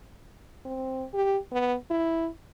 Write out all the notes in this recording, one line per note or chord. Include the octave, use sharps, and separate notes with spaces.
C4
G4
B3
E4